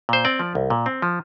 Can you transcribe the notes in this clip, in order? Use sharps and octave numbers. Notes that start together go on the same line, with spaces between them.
A#2 C5
C4 D5
F3
C2
A#2
C4
F3